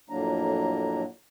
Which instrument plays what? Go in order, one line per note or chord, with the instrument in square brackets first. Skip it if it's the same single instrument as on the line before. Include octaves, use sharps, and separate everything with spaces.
[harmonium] F2 A2 F#3 A#3 D4 A#5